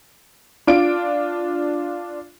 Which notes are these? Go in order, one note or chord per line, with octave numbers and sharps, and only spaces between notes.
D4 F4 D7